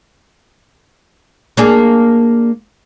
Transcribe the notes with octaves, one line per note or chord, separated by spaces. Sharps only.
A#3 D4 G#4